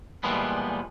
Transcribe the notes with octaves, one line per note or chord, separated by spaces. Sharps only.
A#2 E3 F3 G3 G#3 B3